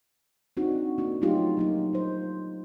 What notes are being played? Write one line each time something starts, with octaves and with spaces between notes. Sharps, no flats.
C4 D4 D#4 F#4
A#3 D4 F#4
F#3 A3 C#4 D#4 F4 G4
F#3 A#3 D#4
F#3 C5